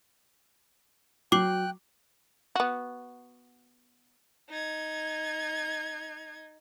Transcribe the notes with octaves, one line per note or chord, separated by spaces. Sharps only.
F#3 G5 D6 F#6 C7 F#7
B3 F#4
D#4 G#6